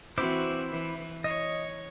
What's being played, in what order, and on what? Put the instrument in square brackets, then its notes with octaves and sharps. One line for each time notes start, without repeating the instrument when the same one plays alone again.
[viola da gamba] E3 C4 F#4 [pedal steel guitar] E4 C5 D6
[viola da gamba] E3
[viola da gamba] C#5 [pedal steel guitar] D#5